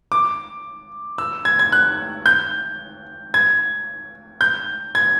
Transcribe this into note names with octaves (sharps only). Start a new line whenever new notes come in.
D6
E6
G#6
G#6
F#6
G6
G#6
G6
G#6